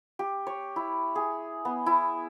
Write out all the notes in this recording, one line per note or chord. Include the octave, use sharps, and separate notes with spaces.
G4
C#5
E4
G#4
B3
E4